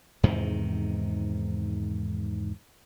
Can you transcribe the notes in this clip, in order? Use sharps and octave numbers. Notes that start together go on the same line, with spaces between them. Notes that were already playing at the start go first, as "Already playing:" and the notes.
E2 G#2 C3 D#3